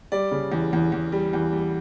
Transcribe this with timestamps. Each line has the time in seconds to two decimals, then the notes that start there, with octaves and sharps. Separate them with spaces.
0.12 G3 D5
0.31 C#3
0.52 E2
0.73 E2
0.92 E2
1.12 G3
1.33 E2
1.53 G3